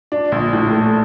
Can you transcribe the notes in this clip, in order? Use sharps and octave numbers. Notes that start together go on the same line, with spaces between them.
D4
A#1
A2
A3